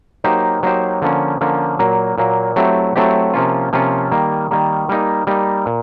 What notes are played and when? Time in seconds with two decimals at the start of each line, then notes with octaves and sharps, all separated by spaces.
0.24 F#3 A#3 D#4 G4 C5
0.63 F#3 A#3 D#4 G4 C5
1.02 D3 F3 A#3 C#4
1.41 D3 F3 A#3 C#4
1.79 A#2 F#3 A#3
2.18 A#2 F#3 A#3
2.56 F#3 A3 C4 E4 G4
2.96 F#3 A3 C4 E4 G4
3.34 C3 F3 A#3 C#4 F4
3.73 C3 F3 A#3 C#4 F4
4.12 D#3 G3 A#3
4.51 D#3 G3 A#3
4.89 G3 A#3 D#4
5.27 G3 A#3 D#4
5.66 A#2